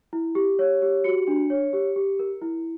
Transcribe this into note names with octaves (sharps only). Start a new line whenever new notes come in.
E4
G4
C#5
G4
F#4 C#7
D4
C#5
G4
G4
A#4
E4